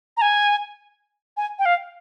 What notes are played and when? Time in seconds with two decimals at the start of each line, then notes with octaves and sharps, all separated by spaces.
0.17 A#5
0.22 G#5
1.37 G#5
1.59 G5
1.66 F5